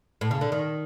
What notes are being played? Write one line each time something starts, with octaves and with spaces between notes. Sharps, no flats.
A2
C#3
D3
D#3